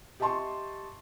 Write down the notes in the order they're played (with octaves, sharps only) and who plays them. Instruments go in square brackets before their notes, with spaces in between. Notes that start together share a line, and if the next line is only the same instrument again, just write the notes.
[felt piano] G4 D#5 E5 A5 C6 C#6